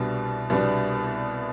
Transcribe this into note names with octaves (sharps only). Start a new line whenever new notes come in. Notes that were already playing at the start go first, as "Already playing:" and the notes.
Already playing: C2 B2 G3 B3 D4
C2 B2 G3 B3 D4